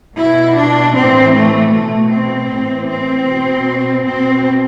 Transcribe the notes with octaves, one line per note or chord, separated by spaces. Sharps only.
B2 E4
D4
A2 E3 C4
A3
B2 A3
C4
A2 E3
C4
B2
B2 C4